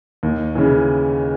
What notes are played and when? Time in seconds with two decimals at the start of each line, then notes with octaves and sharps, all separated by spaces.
0.23 D#2
0.55 C#3 E3